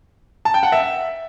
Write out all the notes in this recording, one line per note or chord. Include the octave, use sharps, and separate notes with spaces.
A5
G5
F#5
E5